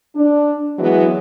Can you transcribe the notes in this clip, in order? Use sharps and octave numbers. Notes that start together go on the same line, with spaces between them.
D4
E3 F#3 G#3 B3